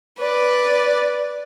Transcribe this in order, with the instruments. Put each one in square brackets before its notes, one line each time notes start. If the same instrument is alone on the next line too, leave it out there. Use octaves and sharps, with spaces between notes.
[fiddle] B4 D5